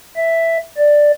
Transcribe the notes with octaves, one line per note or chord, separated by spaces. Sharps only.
E5
D5